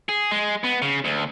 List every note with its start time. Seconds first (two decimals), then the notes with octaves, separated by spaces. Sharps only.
0.09 G#4
0.31 G#3
0.64 B3
0.82 C#3
1.05 D2